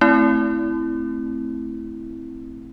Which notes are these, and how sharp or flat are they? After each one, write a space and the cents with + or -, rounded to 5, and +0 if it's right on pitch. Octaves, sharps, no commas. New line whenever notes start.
A3 +0 C4 +0 E4 +0